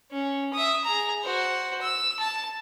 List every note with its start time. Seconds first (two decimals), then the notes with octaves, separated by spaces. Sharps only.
0.11 C#4
0.53 E5 D#6
0.84 G#4 A#5
1.24 F#4 C5
1.81 E6
2.19 A5